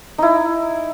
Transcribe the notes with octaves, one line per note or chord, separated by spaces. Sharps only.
D#4 E4